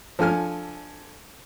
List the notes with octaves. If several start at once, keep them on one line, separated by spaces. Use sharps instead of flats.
F3 D4 A4 G#5 F6